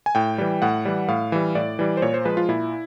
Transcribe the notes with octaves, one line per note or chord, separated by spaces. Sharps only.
G#5
A2 G5
E3 G3
A2 F#5
E3 G3
A2 F5
E3 G3
A2 D5
E3 G3
C5
A#2 C#5
C5
F3 G#3 B4
F4
A#2 E4